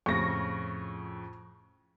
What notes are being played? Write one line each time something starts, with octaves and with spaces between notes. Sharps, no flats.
F2 A2 C#3 C#6 A#6